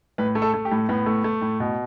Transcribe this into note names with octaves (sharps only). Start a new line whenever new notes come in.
A2 B4
A3
A4
A3
G4
A2
A2 B3
A3
A3
A2
B2